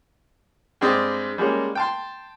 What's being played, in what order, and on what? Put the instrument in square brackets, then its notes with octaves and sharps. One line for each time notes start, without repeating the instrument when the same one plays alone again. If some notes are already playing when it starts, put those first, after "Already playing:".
[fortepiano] G2 G#3 C4 D5 D#5
G3 G#3 A#3 C#4
G5 A5 C6